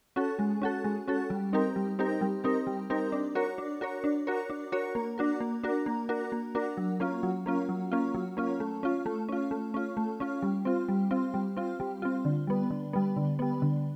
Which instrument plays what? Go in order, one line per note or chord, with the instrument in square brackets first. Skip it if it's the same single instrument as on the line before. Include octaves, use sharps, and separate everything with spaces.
[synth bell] C#4 F#4 A4
G#3
C#4 F#4 A4
G#3
C#4 F#4 A4
G3
C4 D#4 G4 A#4
G3
C4 D#4 G4 A#4
G3
C4 D#4 G4 A#4
G3
C4 D#4 G4 A#4
D4
F#4 A#4 C#5
D4
F#4 A#4 C#5
D4
F#4 A#4 C#5
D4
F#4 A#4 C#5
A#3
D4 F#4 A#4
A#3
D4 F#4 A#4
A#3
D4 F#4 A#4
A#3
D4 F#4 A#4
F#3
A#3 C#4 F4
F#3
A#3 C#4 F4
F#3
A#3 C#4 F4
F#3
A#3 C#4 F4
A3
C#4 F4
A3
C#4 F4
A3
C#4 F4
A3
C#4 F4
G3
C4 F4
G3
C4 F4
G3
C4 F4
G3
C4 F4
D3
G3 B3
D3
G3 B3
D3
G3 B3
D3